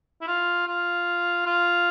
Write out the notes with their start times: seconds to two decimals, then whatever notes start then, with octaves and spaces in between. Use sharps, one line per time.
0.21 E4
0.27 F4
0.67 F4
1.46 F4